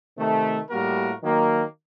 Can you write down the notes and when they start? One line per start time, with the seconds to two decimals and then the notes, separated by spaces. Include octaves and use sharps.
0.17 C3 D#3 A3
0.70 A2 G3 A#3 F#4 A#4
1.22 D#3 F#3 A#3